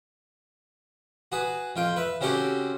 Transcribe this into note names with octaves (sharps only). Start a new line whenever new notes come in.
F#4 G#4 B4
F2 F4 G5
B4 E5
C#3 C4 C#4 F#4 G4 A4